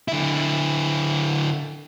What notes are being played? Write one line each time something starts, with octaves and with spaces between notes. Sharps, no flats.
D3 E4